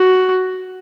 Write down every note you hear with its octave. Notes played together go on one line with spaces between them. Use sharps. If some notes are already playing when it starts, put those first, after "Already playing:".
Already playing: F#4